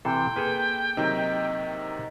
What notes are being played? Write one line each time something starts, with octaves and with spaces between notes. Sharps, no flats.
C3 E3 A4 G5 C6
A#3 G#4 A4 B4
C3 D#3 F#3 D#4